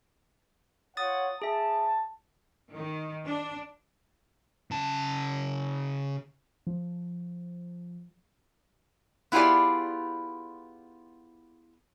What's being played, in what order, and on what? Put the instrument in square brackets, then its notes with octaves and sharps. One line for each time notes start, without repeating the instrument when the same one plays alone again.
[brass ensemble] F4 C#5 F#5 [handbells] D#6 A6
[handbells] G#4 E5 [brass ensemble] A5
[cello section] D#3
D4
[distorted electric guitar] C#3 A5
[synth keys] F3
[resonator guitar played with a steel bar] B3 E4 F4 G4 G#4 D5